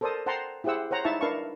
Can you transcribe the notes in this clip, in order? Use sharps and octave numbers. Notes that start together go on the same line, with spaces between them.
A4 A#4 C5 D5 A5 D#6
C5 F#5 G5 A5 A#5 C6
E4 G4 G#4 C5 F#5 E6
C5 C#5 F#5 A#5
D#4 E4 E5 A5 C#6
D4 A#4 B4 F5 A5 C#6